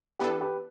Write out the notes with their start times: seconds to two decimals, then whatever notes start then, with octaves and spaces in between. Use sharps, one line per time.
0.19 E3 B3 D4 G4 A4 B4
0.41 G4 B4